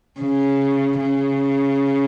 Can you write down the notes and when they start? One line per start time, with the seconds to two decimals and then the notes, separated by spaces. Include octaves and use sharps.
0.20 C#3
1.00 C#3